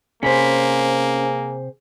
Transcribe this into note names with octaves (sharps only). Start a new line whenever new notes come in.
C3 A#3 C#4 G#4 C5 B5